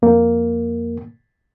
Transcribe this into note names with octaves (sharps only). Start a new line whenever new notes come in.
F2 A#3